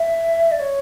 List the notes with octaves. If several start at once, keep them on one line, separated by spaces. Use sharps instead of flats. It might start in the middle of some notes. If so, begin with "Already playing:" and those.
Already playing: E5
D5
C#5